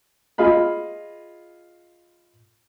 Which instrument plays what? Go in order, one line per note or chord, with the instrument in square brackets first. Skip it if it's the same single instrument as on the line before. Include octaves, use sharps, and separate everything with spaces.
[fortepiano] F4 G#4 D#5 F5 B5